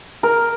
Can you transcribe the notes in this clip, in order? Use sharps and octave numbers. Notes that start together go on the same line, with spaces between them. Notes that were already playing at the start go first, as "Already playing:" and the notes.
A#4